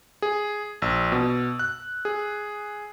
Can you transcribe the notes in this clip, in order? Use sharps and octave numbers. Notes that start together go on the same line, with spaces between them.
G#4
A#1 E6
B2
F#6
G#4